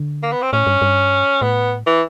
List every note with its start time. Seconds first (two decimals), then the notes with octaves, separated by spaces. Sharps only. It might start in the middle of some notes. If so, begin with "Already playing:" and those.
Already playing: D3
0.23 A#3
0.32 B3
0.42 C4
0.53 A2 C#4
0.67 G2
0.82 G2
1.42 A2 B3
1.86 E3